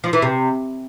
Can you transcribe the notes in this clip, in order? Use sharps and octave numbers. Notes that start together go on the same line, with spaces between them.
F3
E3
C3